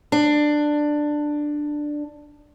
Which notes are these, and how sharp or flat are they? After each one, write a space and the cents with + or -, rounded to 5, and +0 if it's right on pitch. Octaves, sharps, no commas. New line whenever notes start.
D4 +10